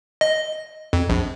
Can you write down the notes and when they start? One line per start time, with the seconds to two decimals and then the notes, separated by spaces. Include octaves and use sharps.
0.21 D#5
0.93 F2
1.10 A#1